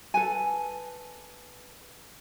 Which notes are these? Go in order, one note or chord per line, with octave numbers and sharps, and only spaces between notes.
A4 B4 G#5